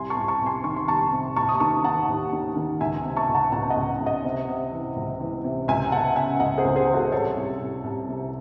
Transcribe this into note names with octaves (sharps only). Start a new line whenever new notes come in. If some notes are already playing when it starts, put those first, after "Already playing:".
Already playing: C2 G#5 C6
A5 C#6
C2
A5 C#6
C2
G#5 C6
D#3 C#6
C6
C2 A5 C#6
C3
D#2 A5 C#6
D#6
D#3 A5 C#6
D#3 F#5 A5
D#2
D#3
D#3
C#2 E5 G#5
C3
A5 C#6
C#2
F#5 A5
C#2 F#5 A5
D#5 F#5
C#2
C#2
D#5 F#5
C3
C3
E3
C#2
E3
C3
C#2 E5 G#5
C#2 F#5 A5
C#3 E5 G#5
C#2 D#5 F#5
G#4 C5
C#2
G#4 C5
E3
F#4 A4
C2 A4 C#5
C2
C2
C2
C3